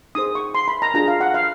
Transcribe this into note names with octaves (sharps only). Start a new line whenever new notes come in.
D#4 G#4 C5 D#6
C#6
C6
B5
A#5
D4 F4 G#4 A#5
F5
F#5
F5